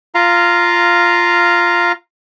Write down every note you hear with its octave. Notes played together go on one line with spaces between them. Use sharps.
F4 F5 A#5